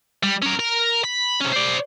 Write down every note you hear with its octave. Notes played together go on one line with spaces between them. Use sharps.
G3
C#4 A#4
A#4
B5
C3 C#4
C5 D5